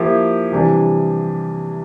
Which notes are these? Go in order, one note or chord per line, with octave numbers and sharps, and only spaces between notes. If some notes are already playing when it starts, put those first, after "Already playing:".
Already playing: F3 A#3 E4 G4
C3 E3 G3 D4